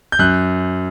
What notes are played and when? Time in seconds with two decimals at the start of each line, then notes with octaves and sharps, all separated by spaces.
0.12 G6
0.19 F#2 F#6